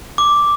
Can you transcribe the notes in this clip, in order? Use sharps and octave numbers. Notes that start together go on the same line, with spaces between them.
D6